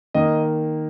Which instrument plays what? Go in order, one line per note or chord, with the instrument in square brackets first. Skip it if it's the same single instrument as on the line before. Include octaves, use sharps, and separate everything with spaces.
[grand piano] D#3 A#3 D#5